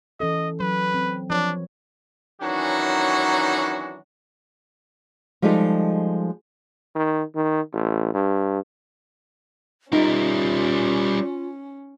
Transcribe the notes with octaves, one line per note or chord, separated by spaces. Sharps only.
E3 C#4 A4 D#5
F#3 B4
C4
F3 D4 B4 C#5
D#3 E3 F#3 C#4 D4 F#4
F3 G3 G#3 D#4 G4 A4
D#3
D#3
A1
G2
G3 C#4 D#4 F4 A#4